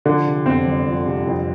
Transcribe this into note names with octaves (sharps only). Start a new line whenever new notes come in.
D3 F3
C3
F2 C4
G1
F3
C3
F2